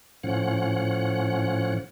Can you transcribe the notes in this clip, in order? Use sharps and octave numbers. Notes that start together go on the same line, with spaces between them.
A2 F3 C#4 F#5